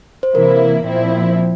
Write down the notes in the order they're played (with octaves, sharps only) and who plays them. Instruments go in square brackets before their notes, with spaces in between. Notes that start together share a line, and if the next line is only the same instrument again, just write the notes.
[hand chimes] C5
[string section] C3 E3 A#3 E4 [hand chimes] A#4
[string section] A#2 F3 C4 E4